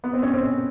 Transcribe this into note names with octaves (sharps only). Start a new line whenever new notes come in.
B3
C4
C#4
C4